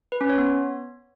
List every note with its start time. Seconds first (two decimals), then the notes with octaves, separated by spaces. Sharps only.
0.12 B4
0.21 C#4
0.29 C#5
0.38 B3